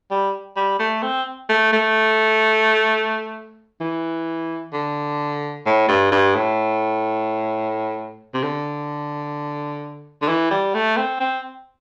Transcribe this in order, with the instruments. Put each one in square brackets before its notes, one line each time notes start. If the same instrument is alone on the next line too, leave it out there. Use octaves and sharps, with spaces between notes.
[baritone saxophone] G3
G3
A3
C4
A3
A3
E3
D3
A2
G2
G2
A2
C3
D3
D3
E3
G3
A3
C4
C4